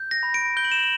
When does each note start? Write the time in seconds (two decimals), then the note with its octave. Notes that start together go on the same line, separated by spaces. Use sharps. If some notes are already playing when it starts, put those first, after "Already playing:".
Already playing: G6
0.11 A#6
0.23 B5
0.34 D7
0.57 G6 G7
0.64 F#7
0.72 E7
0.79 F#7